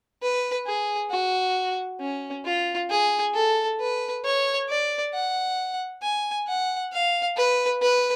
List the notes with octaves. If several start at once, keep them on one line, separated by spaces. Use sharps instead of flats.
B4
G#4
F#4
C#4
F4
G#4
A4
B4
C#5
D5
F#5
G#5
F#5
F5
B4
B4